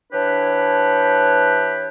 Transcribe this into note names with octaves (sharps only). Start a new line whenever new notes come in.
E3 D4 G4 B4 C#5